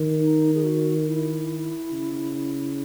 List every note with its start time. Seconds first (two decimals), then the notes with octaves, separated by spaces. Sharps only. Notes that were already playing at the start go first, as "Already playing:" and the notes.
Already playing: D#3
0.21 D#4
0.55 G#4
0.64 F#4
1.08 E4
1.92 C#3